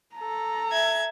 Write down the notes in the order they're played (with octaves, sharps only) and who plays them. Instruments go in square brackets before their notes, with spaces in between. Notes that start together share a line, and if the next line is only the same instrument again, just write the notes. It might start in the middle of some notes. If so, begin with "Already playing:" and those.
[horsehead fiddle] A4 A#5
[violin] E5 G#6